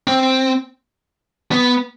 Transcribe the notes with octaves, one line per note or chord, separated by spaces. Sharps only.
C4
B3